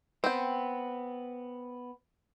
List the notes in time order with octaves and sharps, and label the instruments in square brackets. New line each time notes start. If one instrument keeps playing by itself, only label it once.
[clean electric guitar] B3 [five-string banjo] C4 G5